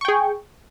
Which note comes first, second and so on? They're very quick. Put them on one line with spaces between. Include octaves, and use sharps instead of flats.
C#6 G5 G#4